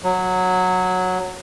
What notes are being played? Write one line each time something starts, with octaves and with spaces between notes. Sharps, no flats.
F#3